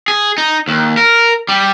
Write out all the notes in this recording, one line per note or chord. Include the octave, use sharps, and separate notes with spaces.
G#4
D#4
D#2
A#4
G3